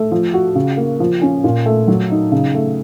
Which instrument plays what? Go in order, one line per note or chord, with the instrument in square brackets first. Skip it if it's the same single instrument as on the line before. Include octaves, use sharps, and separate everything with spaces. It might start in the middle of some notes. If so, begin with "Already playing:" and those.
Already playing: [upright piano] A3
F3
F#4
C#3
A#3
F3
C#4
A#2
A3
F#3
D#4
C#3
A3